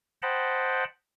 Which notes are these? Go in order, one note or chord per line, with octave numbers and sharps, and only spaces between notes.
C5 D#5 F#5 G5 A5 B5